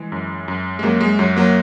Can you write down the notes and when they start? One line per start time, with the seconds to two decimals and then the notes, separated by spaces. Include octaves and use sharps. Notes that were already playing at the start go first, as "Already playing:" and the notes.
Already playing: E3 G#3
0.12 F#2
0.48 F#2
0.79 G#3
0.83 F#2 F#3 A#3
1.01 G#3
1.19 F#2 F#3
1.36 F#3 A#3